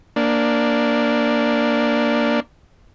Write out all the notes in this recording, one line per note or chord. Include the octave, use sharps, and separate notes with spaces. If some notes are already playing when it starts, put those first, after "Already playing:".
A#3 D4